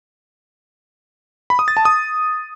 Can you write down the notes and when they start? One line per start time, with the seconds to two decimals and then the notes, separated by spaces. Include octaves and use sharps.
1.50 B5
1.59 D#6
1.68 A6
1.77 A5
1.85 D#6